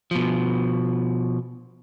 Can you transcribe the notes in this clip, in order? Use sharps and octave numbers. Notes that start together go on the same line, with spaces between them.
B2 F3